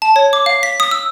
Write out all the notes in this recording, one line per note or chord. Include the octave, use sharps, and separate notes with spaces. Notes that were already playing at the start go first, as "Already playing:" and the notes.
A5
C#5
D6
F5
B6
D#6
E6